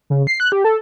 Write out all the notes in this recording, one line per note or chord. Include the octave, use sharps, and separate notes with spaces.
C#3
C7
F#6
G4
A4